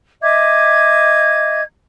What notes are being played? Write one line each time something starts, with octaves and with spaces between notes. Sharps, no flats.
D#5 E5 D6 G#6